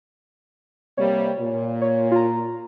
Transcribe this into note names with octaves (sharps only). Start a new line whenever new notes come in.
C3 G3 A#3 C#5
A#2
C#5
F4 A#5